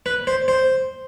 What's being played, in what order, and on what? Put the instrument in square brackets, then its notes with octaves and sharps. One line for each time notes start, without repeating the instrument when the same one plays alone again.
[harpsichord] B4
C5
C5